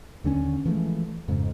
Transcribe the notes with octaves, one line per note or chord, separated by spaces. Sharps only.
D#2 D3 C4 C#4
E3 F3 G#3 A3
F2 G#2 C#3